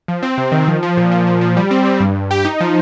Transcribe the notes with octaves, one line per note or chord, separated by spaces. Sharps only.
F3
C4
C3
D#3
F3
F3
A#2
F3
F3
F3
G3
C4
G3
G2
G2
G4
D#4
F3